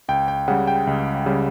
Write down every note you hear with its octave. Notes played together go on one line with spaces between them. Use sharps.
C#2 G5
G5
C#3 G3 F#5
G5
C#2
C#3 G3